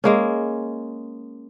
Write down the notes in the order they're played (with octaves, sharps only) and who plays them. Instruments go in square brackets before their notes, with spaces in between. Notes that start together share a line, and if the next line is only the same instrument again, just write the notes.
[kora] G#3 A#3 C#4